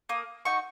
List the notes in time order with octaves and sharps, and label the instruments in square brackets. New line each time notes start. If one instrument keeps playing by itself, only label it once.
[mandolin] A#3 D#6
D#4 F#4 C#6